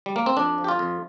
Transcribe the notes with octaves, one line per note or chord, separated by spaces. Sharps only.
G3
A#3
C4
F2 D4
F3
G4
F4
F2